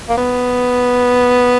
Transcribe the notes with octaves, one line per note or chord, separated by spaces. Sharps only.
A#3
B3